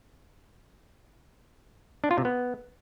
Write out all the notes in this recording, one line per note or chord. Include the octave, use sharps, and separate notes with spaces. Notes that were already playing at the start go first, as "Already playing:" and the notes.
D4
F4
C3
B3